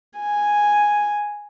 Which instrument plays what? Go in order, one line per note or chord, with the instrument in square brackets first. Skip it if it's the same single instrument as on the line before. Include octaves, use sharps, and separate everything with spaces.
[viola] G#5